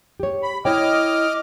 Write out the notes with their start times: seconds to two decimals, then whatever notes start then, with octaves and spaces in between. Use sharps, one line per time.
0.20 G4 C#5
0.43 B5
0.65 E4 C#5 D#5 G5 D6 F6